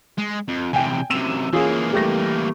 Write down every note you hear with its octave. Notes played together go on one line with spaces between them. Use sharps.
G#3
F2
E2 C3 G5 G#5
F#2 C3 E6 D#7 E7
E3 A#3 C#4 F4 G#4
G3 A3 A#6